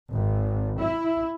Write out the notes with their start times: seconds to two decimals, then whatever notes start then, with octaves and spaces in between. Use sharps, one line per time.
0.11 G#1
0.80 E4